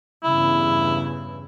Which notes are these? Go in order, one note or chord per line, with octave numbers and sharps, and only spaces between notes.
E2 G2 C#3 E4